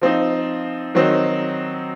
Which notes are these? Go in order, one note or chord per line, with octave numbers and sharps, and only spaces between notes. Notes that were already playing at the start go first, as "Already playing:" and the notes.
F3 C4 D#4
D#3 F#3 C4 D#4